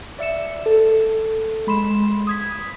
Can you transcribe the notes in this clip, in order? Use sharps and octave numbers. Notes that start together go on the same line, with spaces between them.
D5 E5 C#7 E7
A4
G#3 B5 C6 E7
D#6 G#6 B6